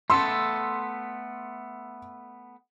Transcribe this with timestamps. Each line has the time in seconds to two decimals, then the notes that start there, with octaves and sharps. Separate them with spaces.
0.10 A3 B3 A4 C6 E6